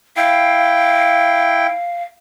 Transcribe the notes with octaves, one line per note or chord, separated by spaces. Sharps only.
E4 F5 G5